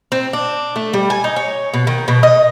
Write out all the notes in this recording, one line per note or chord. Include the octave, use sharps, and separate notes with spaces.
C4
D4
A3
G3
G#5
D#4
C#5
B2
D#3
B2
D#5